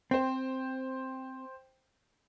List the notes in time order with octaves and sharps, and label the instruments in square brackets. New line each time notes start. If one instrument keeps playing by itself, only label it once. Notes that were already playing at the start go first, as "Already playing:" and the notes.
[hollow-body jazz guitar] C4 [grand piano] C5 G5